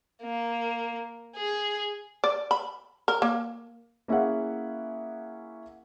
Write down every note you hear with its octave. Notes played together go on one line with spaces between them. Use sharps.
A#3
G#4
D5
B5
A#4
A#3
A#3 C#4 E4 G#4 F5 F#5